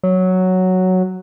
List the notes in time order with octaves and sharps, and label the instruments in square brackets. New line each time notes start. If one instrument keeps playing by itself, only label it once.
[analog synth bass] F#3